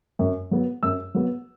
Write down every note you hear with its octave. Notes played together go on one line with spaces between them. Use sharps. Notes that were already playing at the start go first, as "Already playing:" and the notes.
F#2
F#3 B3
F#2 E6
F#3 B3